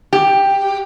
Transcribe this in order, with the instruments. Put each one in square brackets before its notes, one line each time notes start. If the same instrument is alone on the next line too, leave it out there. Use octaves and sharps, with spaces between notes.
[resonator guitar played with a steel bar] G4